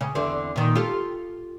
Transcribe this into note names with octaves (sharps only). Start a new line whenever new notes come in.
C#3
E2 D3 C4
A#2 D#3
F4 G4 A4